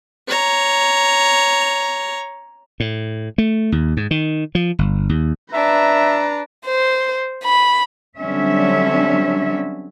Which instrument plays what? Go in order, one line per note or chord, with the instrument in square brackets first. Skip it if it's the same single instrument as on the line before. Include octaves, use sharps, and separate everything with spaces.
[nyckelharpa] C#5 A#5
[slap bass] A2
A3
D#2
G#2
D#3
F3
G1
D#2
[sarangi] D4 [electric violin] B4 A#5 [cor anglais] E5
[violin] C5
B5
[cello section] D3 F#3 G3 C4 C#4 E5